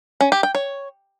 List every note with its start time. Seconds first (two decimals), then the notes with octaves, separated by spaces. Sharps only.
0.21 C#4
0.32 G4
0.43 G5
0.55 C#5